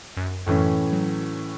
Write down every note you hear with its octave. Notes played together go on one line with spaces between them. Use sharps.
F#2
F#2 A2 E3 C#4
F#3